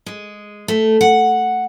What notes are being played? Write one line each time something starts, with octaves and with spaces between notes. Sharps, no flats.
G#3
A3
F#5